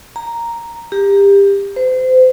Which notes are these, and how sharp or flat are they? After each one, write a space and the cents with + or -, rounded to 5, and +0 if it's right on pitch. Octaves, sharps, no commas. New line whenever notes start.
A#5 -5
G4 +25
C5 -30